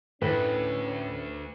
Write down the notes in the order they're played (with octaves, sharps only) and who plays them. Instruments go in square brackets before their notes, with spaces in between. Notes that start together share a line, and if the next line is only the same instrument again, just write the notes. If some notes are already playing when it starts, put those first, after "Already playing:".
[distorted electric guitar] D2 [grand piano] A2 [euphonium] C#4 [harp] B4